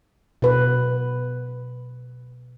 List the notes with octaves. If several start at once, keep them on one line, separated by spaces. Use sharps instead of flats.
B2 B4